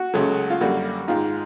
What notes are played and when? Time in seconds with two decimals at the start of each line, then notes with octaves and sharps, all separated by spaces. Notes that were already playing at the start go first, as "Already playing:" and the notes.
Already playing: F#4
0.14 C#2 C#3 F#3 A3
0.50 F4
0.60 F#2 D3 G3 A#3 F#4
1.08 G#2 D#3 G#3 F4